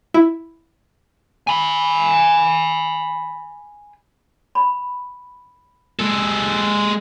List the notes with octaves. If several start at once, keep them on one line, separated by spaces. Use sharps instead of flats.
E4
G#5 B5
B5
G#3 A4